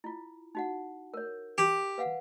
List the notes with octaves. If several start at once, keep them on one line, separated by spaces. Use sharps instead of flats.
E4 F4
D#4 F#4 F#5
A#4 C#5
G4
B4 F5 F#5